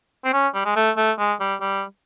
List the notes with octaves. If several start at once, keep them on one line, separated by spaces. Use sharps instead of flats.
C4
C#4
G3
G#3
A3
A3
G#3
G3
G3